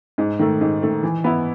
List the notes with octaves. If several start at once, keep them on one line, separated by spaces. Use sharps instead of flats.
G#2
D#3 A3
G#2
D#3 A3
E3
B3 E4